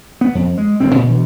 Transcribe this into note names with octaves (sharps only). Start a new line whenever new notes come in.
B3
F2
G#3
G1 F#2 C#3 C4
D2 A#2
D2 B2 E3